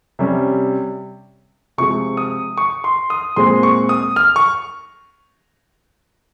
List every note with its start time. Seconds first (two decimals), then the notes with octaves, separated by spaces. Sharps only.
0.19 C3 G3 C#4
1.78 C3 F3 G#3 C#6
2.17 D#6
2.58 C#6
2.84 C6
3.10 D#6
3.36 A#2 G#3 C4 C6
3.63 C#6
3.89 D#6
4.16 F6
4.36 C#6